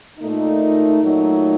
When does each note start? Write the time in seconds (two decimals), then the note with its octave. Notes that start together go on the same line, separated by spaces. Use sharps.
0.19 A#2 A3 D#4
1.02 A#2 F#3 A3 D#4